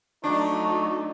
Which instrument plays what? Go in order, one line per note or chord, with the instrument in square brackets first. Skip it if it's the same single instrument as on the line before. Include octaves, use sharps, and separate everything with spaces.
[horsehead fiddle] F#3 A3 [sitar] D4 [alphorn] D#4 [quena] C#6